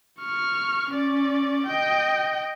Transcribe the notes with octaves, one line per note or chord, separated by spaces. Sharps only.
C#6 F6
C#4 D5
D#5 G5